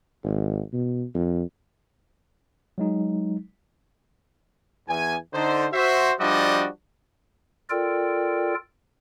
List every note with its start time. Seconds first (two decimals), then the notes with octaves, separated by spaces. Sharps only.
0.24 G#1
0.73 B2
1.15 F2
2.78 F#3 G#3 D#4
4.88 E2 G#5
5.34 D3 D#4 C5
5.73 F#4 C5 E5
6.21 F3 G3 D4 F#4 D5 D#5
7.70 F4 A4 A#4 D5 G5